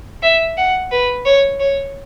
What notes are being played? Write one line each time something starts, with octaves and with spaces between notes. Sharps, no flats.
E5
F#5
B4
C#5
C#5